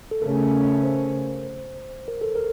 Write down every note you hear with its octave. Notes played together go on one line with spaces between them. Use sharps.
A4
C#3 A3 C#4 A#4
C5
A#4
A4
A#4